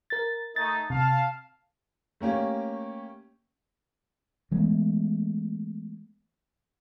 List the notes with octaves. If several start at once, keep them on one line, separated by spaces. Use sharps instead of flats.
A#4 A6
A3 D#4 A6
C3 F5 A5
A3 A#3 C#4 G4
E3 G#3 A3 B3